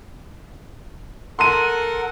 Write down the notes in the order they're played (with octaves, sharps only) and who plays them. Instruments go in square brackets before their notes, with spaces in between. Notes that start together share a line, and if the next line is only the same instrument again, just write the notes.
[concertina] A4 A#4 F#5 [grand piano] C6 D#7